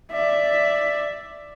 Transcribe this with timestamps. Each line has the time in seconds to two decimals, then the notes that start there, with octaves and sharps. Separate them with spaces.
0.12 D5 E5